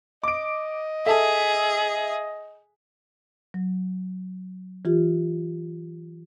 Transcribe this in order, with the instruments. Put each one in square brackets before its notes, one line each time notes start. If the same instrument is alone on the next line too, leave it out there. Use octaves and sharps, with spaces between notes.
[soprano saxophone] D#5 [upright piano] D6 D7
[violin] G#4 [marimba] A4 A5 [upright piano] E5
[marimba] F#3
E3 F4 G4